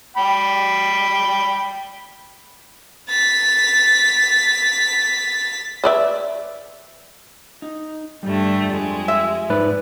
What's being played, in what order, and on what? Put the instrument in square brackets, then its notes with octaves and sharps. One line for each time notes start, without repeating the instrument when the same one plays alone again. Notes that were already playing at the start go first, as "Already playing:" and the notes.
[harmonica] G5 B5
[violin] A6 B6
[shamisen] B4 D5 E5
[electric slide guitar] D#4
[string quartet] G2 D3 A3 [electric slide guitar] G3 G4
[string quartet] F2 G#3
[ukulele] E5
[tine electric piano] G#2 B4 [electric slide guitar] D5